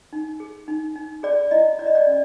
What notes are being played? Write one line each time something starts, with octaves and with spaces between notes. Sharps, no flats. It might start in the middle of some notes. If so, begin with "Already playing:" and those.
D#4
G#4
D#4
D#4
G#4 D5
E4 D#5
E4 D5
D#5
D5
C#4